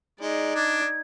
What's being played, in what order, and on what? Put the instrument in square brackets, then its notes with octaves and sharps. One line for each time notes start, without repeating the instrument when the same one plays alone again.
[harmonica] G#3 [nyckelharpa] D#4 D5
[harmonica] D4 [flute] G#6